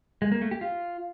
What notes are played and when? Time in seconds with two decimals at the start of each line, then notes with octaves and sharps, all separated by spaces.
0.22 G#3
0.32 A#3
0.42 A3
0.51 G4
0.61 F4